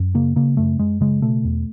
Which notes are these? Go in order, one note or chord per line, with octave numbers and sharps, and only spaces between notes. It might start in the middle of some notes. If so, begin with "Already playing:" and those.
Already playing: F#2
C#3 A#3
C#3 A#3
F#2 A3
F#2 G#3
C#3 G#3
B2 A3
E2